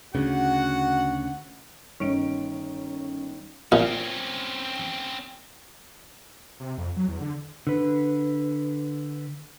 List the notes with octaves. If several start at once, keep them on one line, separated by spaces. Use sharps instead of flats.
D2 C#3 F#4 F#5
G1 D#3 C#4 D7
A#2 C4 C#4
C3
F2
F#3
E2
D3
D3 B4